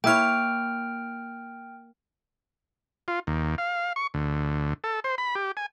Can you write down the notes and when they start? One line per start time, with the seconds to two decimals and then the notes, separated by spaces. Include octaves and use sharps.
0.04 A#3 E4 C#5 G5 F6
3.08 F4
3.27 D#2
3.58 F5
3.96 C#6
4.14 D2
4.84 A4
5.04 C5
5.18 B5
5.35 G4
5.57 G#5